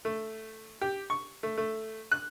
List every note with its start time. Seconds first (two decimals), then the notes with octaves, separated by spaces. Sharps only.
0.05 A3
0.81 G4
1.10 C#6
1.43 A3
1.57 A3
2.12 F#6